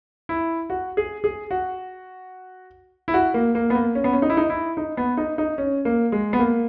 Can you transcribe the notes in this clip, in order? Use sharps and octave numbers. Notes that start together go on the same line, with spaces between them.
E4
F#4
G#4
G#4
F#4
E4
F#4
A#3
A#3
B3
A#3
C#4
B3
C#4
D#4
E4
D#4
E4
D#4
B3
D#4
D#4
C#4
A#3
G#3
B3
A#3